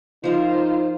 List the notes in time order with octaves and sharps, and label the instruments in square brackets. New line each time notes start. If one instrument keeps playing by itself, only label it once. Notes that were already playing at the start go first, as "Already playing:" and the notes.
[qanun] F3 A#4 [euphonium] D#4 [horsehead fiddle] F4 C5